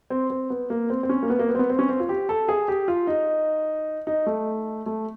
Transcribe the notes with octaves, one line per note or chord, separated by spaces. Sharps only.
C4
C4
B3
A#3
C4
C4
C#4
A#3
B3
A#3
B3
C4
B3
C4
C#4
C4
F4
G4
A4
G#4
G4
F4
D#4
D#4
A3
A3